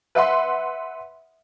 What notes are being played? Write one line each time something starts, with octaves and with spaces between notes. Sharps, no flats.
B4 E5 F#5 C6